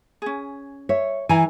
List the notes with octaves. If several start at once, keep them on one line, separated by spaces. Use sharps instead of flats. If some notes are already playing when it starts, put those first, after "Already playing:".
C#4 G#4
C#5 E5
E3 G#5 A#5